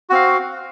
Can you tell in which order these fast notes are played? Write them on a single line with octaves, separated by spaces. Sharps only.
F#4 C4 F5